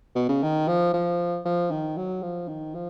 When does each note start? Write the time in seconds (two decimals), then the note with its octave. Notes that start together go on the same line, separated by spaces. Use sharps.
0.15 B2
0.29 C#3
0.43 D#3
0.68 F3
0.94 F3
1.45 F3
1.71 D#3
1.97 F#3
2.23 F3
2.48 D#3
2.74 F3